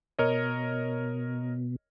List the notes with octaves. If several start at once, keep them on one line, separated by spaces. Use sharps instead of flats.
B2 A#4 C#5 D#5